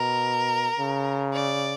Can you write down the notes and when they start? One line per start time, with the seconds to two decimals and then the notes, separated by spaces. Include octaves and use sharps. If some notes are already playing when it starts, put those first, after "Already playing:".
Already playing: B2 A#4
0.79 C#3
1.33 D5